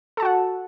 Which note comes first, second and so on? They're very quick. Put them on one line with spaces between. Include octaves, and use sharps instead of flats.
A4 A5 F#4 F#5